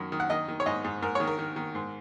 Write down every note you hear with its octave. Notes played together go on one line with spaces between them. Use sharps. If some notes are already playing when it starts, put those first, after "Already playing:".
Already playing: F#2 D#3
D#3
F#5
D#3 D#5
D#3
C#5
G#2 D#5
G#2
G#2 A#4
D#3 C#5
A#4
D#3
D#3
G#2